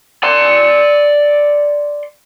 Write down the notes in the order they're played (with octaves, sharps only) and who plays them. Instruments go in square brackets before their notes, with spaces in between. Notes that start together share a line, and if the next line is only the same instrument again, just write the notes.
[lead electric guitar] D5 C6